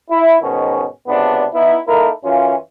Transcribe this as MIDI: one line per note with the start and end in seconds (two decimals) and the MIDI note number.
0.11 0.39 64
0.42 0.85 44
0.42 0.85 47
0.42 0.85 51
0.42 0.85 61
1.08 1.45 37
1.08 1.45 48
1.08 1.45 59
1.08 1.45 62
1.54 1.77 59
1.54 1.77 63
1.54 1.77 64
1.87 2.10 58
1.87 2.10 63
1.87 2.10 64
1.87 2.10 69
1.87 2.10 70
2.24 2.55 42
2.24 2.55 52
2.24 2.55 61
2.24 2.55 65